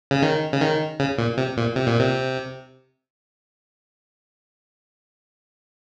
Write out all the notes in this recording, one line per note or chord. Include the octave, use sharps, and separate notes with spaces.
C#3
D#3
C#3
D#3
C#3
A#2
C3
A#2
C3
A#2
C3